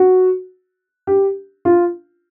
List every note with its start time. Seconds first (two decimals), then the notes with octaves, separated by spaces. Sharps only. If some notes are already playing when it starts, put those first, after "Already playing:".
Already playing: F#4
1.07 G4
1.65 F4